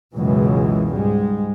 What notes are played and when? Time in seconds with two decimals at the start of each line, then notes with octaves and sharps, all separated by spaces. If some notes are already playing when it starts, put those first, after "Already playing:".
0.15 C#2 F#2 B2 E3 G#3
0.94 G#2 G3 G#3